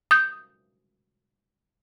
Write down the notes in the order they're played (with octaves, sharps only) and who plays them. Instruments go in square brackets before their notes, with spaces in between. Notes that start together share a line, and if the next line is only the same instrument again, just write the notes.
[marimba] D#6 G6